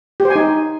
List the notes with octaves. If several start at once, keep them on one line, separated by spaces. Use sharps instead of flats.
G4
C5
G#5
D#4